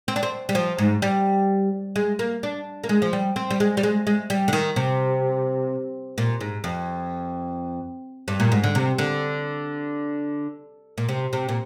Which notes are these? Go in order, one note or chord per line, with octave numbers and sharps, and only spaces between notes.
C4
D4
C4
G3
F3
G#2
G3
G#3
A#3
D4
A#3
G#3
F3
G3
C4
G3
G#3
G3
G#3
G#3
G3
D3
D#3
C3
A#2
G#2
F2
G2
A#2
G#2
D3
C3
D3
A#2
C3
C3
A#2